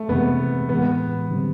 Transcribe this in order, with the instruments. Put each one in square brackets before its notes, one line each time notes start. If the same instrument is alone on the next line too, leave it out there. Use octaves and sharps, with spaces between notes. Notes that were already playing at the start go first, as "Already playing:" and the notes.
Already playing: [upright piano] A3
[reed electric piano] F2 C3 E3 G#3 C4 [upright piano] B3
[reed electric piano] A2 E3 G#3 [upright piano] B3
[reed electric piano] D3 G3 C4